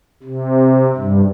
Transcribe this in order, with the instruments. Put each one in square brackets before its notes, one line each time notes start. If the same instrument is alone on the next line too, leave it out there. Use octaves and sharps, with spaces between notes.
[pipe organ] C3
G2